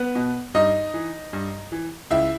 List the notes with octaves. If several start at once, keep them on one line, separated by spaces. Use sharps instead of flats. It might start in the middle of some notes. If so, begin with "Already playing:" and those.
Already playing: B3 B4
B2
G2 D#4 D#5
E3
G2
E3
C#2 E4 E5